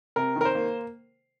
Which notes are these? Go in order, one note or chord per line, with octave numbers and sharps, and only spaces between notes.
C3 A#4
D#3 A#4
C5
A#3